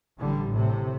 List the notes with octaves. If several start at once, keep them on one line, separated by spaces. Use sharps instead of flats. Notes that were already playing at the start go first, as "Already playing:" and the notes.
A1 D3 G3
A2 C3